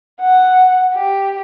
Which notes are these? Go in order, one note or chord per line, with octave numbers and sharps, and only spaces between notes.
F#5
G4